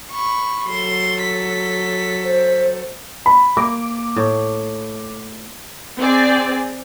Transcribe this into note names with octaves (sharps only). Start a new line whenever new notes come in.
B5 C#6
F#3 A4 C6
B6
C5
B5
A#3 D6
A2
C4 G#4 D5